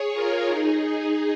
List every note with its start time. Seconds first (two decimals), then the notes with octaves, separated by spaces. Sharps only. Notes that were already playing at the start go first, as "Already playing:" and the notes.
Already playing: G#4 C#5
0.14 F4 A#4
0.48 D#4 G#4